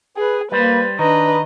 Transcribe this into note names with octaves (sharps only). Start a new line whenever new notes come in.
G#4 B4
G3 A#3 B4 C5
D#3 D4 B4 D#5 A#5